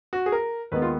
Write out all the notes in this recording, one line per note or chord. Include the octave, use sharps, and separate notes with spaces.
F#4
G#4
A#4
D#2 D#3 G#3 B3 B4
F4